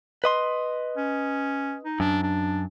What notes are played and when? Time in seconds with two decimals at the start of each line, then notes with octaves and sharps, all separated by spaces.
0.24 B4 D#5 C6
0.97 C#4
1.84 D#4
2.00 F#2 D4
2.23 D4